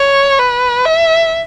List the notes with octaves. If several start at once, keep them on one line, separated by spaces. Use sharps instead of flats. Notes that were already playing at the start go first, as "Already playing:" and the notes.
Already playing: C#5
B4
E5